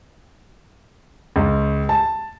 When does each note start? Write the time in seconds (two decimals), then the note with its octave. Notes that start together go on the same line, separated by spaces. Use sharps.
1.36 C#2
1.89 A5